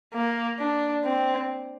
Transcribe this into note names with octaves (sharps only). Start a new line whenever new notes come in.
A#3
D4
C4